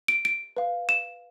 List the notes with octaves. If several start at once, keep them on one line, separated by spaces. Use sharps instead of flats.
D7
D7
B4 F5
E7